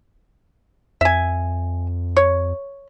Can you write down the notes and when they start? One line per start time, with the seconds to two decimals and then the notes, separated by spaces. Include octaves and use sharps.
1.01 F2 E5 G#5
2.17 C#5